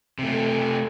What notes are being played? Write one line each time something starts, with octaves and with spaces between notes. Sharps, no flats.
C3 A3